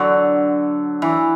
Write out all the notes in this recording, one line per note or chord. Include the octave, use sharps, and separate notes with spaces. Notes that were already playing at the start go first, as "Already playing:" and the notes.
Already playing: D3 F#3
E3